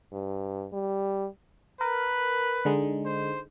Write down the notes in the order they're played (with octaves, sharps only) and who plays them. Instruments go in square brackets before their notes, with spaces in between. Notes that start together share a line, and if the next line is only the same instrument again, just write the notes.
[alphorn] G2
G3
[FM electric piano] A#4 [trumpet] B4
[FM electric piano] D3 G#3 D#4
[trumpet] C5